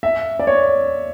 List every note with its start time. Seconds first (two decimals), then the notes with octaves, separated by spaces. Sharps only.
0.03 E5
0.39 D5
0.47 C#5